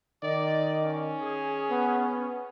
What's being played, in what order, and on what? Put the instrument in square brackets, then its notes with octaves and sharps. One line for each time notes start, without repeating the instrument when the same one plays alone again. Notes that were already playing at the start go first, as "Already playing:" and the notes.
[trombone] D#3 [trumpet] D5 [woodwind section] D#5 D6
[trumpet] C#4
[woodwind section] G#4
[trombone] B3